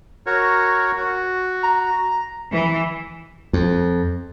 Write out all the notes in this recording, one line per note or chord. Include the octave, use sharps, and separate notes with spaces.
F#4 A#4 C#5
F#4
A#5
E3
F2